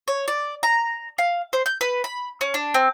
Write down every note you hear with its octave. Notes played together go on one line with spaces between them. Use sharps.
C#5
D5
A#5
F5
C5
G6
B4
B5
C#4
D4
C4